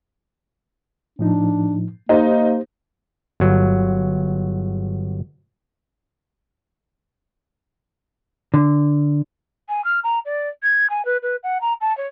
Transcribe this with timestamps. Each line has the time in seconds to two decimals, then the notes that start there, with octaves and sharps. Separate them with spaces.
1.19 A2 F3 D4 D#4
2.09 A#3 D#4 G4 C5
3.40 G1 F#3
8.54 D3
9.69 G#5
9.85 F6
10.04 A#5
10.25 D5
10.63 G#6
10.90 G#5
11.05 B4
11.23 B4
11.44 F#5
11.61 A#5
11.81 A5
11.97 C#5